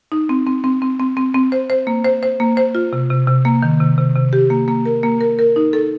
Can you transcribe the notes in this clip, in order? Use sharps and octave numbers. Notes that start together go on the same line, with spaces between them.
D#4
C4
C4
C4
C4
C4
C4
C4
C5
C5
A#3
C5
C5
A#3
C5
F4
C3
C3
C3
A#3
D#3
C3
C3
C3
G4
A#3
A#3
A#4
A#3
A#4
A#4
D#4
A4